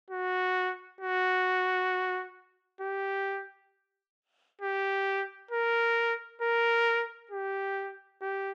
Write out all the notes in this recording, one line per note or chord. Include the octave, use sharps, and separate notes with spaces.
F#4
F#4
G4
G4
A#4
A#4
G4
G4